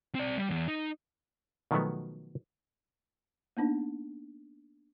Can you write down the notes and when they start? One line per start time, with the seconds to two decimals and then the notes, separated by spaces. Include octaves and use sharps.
0.15 C4 D5
0.38 G3
0.49 E2
0.68 D#4
1.71 B2 D#3 F3 F#3 A3 B3
3.57 A#3 B3 D4 D#4